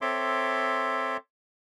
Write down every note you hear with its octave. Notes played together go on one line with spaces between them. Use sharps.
C4 A4 C#5 E5 C6 D6